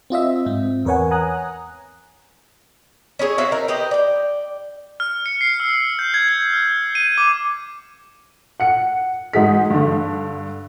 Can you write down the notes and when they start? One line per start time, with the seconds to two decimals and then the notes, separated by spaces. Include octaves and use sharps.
0.10 C4 F4 D#5 E5
0.46 G#2 C4
0.85 E2 A#4 B4 C#5 F#5 G#5
1.11 F#5 G#5 A#5 D#6 F#6
3.19 C#4 E4 G#4 C#5
3.38 C4 F#4 E5 F5
3.51 D#4 A#4
3.68 G4 B4 C5 D#5
3.91 D5 G5
5.00 F6
5.26 C#7
5.41 C7
5.60 E6
5.99 G6
6.14 G#6
6.29 G#6
6.53 F6
6.95 D#7
7.18 D6
8.60 F#5 C#7
9.33 G#2 D#4 F#4 G#4 B6
9.70 G2 D3